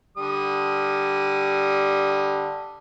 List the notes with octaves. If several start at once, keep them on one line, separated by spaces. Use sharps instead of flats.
D3 G3 D#6